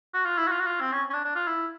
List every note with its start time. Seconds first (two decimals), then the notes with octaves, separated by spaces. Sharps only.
0.14 F#4
0.25 F4
0.38 E4
0.47 F#4
0.51 F4
0.60 F#4
0.66 F4
0.80 C4
0.92 C#4
1.10 C#4
1.13 D4
1.25 D4
1.35 F4
1.47 E4